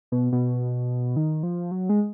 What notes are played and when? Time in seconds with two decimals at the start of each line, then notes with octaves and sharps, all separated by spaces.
0.12 B2
0.32 B2
1.16 D#3
1.43 F3
1.71 F#3
1.89 G#3